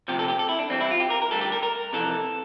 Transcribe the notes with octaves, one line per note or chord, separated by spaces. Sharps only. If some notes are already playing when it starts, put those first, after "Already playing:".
D2 C3 F3 G4
A4
G4
A4
E4
D4
G2 E3 G3 C4
E4
F4
G4
A#4
A#4
D2 D3 G3 A4
G4
A#4
A#4
F2 C3 E3 A4